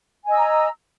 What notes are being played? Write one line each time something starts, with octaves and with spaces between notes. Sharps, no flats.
D#5 G#5 A#5 E6